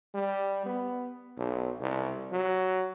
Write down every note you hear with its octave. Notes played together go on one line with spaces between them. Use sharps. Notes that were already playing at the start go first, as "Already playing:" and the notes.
G3
B3
B1
C2
F#3